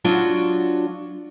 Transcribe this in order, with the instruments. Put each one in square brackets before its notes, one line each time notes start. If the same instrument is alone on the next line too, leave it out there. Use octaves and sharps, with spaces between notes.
[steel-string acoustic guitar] F#3 D4 F4 F#4